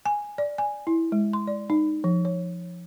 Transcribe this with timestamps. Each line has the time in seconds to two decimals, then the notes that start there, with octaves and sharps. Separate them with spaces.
0.06 G#5
0.38 D5
0.58 G#5
0.87 E4
1.12 G#3
1.33 C6
1.47 D5
1.70 D#4
2.04 F3
2.25 C#5